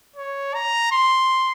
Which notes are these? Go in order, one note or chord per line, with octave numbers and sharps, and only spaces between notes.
C#5
A#5
C6